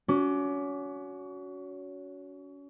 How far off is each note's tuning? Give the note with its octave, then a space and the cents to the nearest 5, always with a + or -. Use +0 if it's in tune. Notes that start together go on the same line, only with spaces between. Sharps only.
C#4 +30 F#4 +0 D6 +0